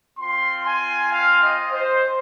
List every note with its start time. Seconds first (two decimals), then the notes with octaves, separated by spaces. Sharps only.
0.18 C4 F4 C6
0.64 G#5
1.11 F5
1.42 D#5
1.72 C5